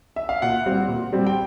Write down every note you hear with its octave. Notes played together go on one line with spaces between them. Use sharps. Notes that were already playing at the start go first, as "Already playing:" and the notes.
E5
F5
A#2 F#5
G3 C4
A#2
G3 C4
G5